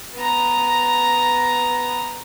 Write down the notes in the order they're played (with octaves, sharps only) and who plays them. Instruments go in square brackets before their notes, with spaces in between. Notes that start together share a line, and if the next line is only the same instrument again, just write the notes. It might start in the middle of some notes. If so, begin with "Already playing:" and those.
[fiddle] B3 A#5